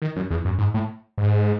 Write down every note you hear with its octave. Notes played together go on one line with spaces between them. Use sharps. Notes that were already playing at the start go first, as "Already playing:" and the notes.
D#3
F#2
E2
F#2
G#2
A2
G#2